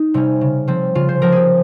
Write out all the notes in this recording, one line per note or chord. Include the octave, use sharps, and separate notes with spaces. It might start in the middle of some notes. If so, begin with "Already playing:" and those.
Already playing: D#4
C3 G3 C#4
C#3
F3 C4
C#3 F4
C5
F3 C4 A#4
G4 G#4